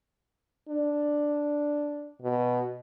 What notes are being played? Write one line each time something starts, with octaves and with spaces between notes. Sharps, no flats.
D4
B2